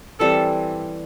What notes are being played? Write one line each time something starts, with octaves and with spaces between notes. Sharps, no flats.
E3 G3 C4 A4